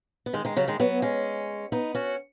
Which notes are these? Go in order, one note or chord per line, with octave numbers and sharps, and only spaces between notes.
B3
D#3 G#3
D#3 G#3
C#3 F#3
D#3 G#3
F#3 B3
G#3 C#4
B3 D#4
C#4 F#4